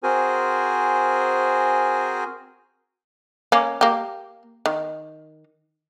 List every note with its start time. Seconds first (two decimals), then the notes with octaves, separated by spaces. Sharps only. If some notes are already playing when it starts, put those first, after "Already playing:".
0.03 C4 F#4 G#4 A#4 C5 G#5
3.52 A#3 C#4
3.81 A#3 G4
4.66 D#3